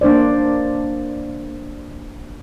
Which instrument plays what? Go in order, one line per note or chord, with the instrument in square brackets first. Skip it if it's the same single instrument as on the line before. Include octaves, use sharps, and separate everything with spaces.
[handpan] A#3 D4 C5 D5